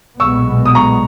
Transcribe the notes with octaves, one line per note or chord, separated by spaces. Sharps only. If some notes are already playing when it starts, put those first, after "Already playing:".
B1 A#2 G#3 B3 C#6 E6
D#6
A#5 C#6